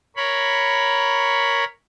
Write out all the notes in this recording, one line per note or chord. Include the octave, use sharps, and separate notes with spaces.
A#4 C#5 B5